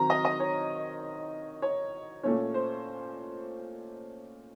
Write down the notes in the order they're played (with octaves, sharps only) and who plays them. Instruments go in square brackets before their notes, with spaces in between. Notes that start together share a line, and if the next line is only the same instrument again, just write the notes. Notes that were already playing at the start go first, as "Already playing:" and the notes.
Already playing: [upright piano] D#3 F#3 C4 A#5
D#5
D#5
C#5
C#5
A#2 A3 C#4 C#5
C5